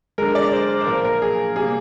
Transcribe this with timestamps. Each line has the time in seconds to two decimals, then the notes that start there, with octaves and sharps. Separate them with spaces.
0.18 D3 G#3 A#4
0.35 D5
0.53 C5
0.81 C5
0.87 A#2 F3 A#3 A#4
1.04 A#4
1.22 G#4
1.56 C3 G3 A#3 G#4